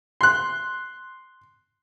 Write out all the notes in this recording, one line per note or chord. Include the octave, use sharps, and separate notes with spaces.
C6 F#6